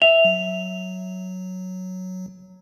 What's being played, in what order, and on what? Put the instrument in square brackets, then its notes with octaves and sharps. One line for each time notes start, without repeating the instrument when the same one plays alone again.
[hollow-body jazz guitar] E5 [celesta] F7
[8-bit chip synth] F#3